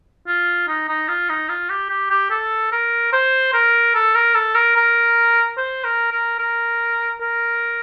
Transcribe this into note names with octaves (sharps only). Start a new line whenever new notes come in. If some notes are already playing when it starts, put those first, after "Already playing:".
F4
D#4
D#4
F4
D#4
F4
G4
G4
G4
A4
A#4
C5
A#4
A4
A#4
A4
A#4
A#4
C5
A#4
A#4
A#4
A#4